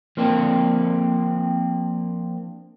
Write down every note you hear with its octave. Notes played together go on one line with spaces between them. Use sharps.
F3 A#3 C4 D4